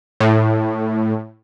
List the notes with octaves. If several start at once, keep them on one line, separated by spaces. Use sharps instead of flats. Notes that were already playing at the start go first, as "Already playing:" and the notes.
A2